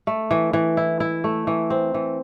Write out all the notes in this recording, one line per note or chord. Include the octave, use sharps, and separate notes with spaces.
A3
E3
E3
E4
E4
A3
E3
C4
E3